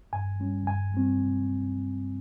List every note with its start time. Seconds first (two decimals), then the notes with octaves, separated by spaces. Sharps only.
0.13 G2 G#5
0.40 G3 C#4
0.67 G2 G#5
0.94 G3 C4